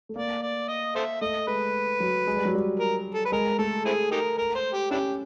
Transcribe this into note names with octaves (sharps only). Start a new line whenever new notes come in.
A3
A#3 D5
D5
D#5
A4 C5 E5
A3 D#5
G#3 B4
F#3
G#3
G3
F#3
G3
A#4
A4
B4
G#3 A#4
A3 A4
C4 E4 G#4
D#4 G4 A#4
A#4
C5
G4
C#4 D4 E4 G4